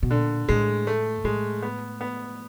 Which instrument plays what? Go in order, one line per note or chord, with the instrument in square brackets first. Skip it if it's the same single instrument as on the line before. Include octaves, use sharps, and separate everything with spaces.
[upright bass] B2
[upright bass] A#2 [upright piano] D3
[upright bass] A2 [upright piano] G#3
[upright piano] A3
[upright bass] A2 [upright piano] G#3
[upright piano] B3
B3